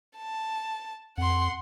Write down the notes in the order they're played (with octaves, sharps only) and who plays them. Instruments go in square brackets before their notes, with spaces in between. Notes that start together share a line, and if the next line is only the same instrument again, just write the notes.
[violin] A5
[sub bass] F2 [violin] F#5 C6